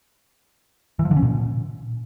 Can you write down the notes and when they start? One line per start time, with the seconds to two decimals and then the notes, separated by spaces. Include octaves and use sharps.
0.99 E3
1.05 F3
1.11 D3
1.17 C#4
1.22 A#2